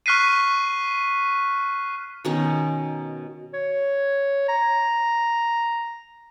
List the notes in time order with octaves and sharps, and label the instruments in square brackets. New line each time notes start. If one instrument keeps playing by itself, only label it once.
[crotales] C#6 F6 F#6 B6 C7 D#7
[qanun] B2 D#3 C#4
[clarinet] C#5
A#5